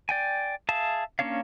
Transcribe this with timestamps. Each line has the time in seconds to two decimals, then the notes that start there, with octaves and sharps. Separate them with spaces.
0.09 D5 G5 G#5
0.69 G#4 E5 F5 A5
1.19 A#3 C#4 D4 C#5 F5